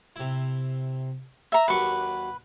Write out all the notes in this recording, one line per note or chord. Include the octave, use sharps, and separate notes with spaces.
C3 E4
E5 A#5
D#2 F#3 D4 B4 C#6